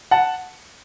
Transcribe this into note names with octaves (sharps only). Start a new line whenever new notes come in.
F#5 A5